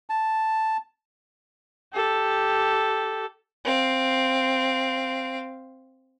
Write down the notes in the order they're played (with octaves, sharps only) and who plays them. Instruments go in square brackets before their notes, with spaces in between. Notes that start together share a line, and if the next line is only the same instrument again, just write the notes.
[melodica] A5
[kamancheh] G4 A4
[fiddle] C4 F5